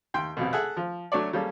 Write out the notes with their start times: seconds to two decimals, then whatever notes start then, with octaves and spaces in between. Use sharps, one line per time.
0.14 D#2 G5 C6
0.37 C2 F2 B2
0.53 G#4 A4 E5 F#5
0.77 F3
1.12 F#3 A3 D4 C#5 D5
1.33 G3 A#3 C#4 G#4 A4